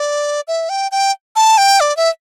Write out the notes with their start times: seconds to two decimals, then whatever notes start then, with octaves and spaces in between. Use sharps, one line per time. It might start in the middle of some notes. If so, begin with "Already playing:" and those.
Already playing: D5
0.47 E5
0.69 G5
0.91 G5
1.36 A5
1.58 G5
1.80 D5
1.97 E5